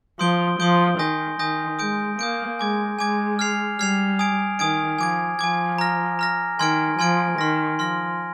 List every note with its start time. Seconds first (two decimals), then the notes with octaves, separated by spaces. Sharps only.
0.19 F3 C6 D#6 G6 D7 G7
0.59 F3 C6 D#6 G6 D7 G7
0.99 D#3 G#5 D#6 G6 A#6
1.39 D#3 G#5 D#6 G6 A#6
1.79 G#3 D#6 G6 D7
2.19 A#3 D#6 G6 D7
2.59 G#3 G#5 D6 G#6
2.99 G#3 G#5 D6 G#6
3.39 F6 G#6 C7 F7
3.79 G3 F6 G#6 C7 F7
4.19 G#5 D#6 G#6 D7
4.59 D#3 G#5 D#6 G#6 D7
4.99 F3 G#5 D6 G#6
5.39 F3 G#5 D6 G#6
5.78 A#5 F6 A#6
6.19 A#5 F6 A#6
6.59 D#3 G#5 C6 F6 G#6 D7
6.99 F3 G#5 C6 F6 G#6 D7
7.38 D#3 C6 F6 A#6
7.79 F3 C6 F6 A#6